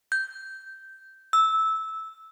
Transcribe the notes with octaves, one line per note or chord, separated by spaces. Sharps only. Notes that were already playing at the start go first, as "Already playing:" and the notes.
G6
E6